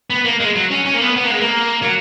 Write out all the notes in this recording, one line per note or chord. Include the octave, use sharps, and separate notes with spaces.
B3
A#3
G#3
F#3
C#4
C#4
A#3
B3
B3
A#3
G#3
A#3
F#3